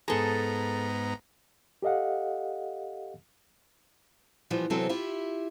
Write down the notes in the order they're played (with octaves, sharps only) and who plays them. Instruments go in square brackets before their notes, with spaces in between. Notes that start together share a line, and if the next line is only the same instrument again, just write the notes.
[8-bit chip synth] G#2 B3 A#5 [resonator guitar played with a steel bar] G#4 A4
[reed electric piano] G4 A4 D#5 F5 F#5
[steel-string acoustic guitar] A#2 E3 F3 G3 B3
C3 E3 F#3 B3 C4 A4
E4 F4 G4 E5